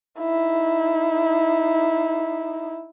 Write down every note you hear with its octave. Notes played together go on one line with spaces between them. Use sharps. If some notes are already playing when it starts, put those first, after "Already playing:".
D#4 E4